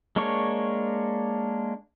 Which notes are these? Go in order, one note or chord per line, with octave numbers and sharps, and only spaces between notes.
G#3 A#3 D4 C#5 C#6